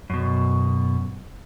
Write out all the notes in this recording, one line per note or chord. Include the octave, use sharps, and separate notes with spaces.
F#2 B2